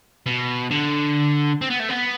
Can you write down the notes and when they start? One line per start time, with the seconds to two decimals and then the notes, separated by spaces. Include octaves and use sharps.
0.26 B2
0.71 D3
1.61 C4
1.70 B3
1.79 A3
1.89 B3